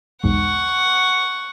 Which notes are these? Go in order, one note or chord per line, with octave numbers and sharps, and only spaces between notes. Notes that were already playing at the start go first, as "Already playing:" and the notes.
B1 E2 G#2 F#5 C#6